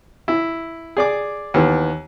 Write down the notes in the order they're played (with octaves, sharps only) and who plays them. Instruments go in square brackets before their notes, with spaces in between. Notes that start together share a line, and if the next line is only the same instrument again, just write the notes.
[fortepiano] E4
G#4 D5 D6
D#2 E3 B3